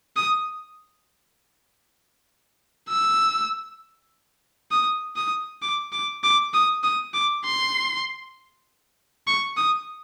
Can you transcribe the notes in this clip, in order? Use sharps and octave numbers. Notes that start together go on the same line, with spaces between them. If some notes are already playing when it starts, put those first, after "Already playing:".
D#6
E6
D#6
D#6
D6
D6
D6
D#6
D#6
D6
C6
C#6
D#6